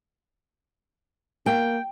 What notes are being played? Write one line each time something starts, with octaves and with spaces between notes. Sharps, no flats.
A#3 G5